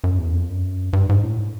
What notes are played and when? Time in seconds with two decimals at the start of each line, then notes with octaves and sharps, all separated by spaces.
0.04 F#2
0.18 E2
0.34 F2
0.49 F#2
0.93 G2
1.09 G#2
1.23 A2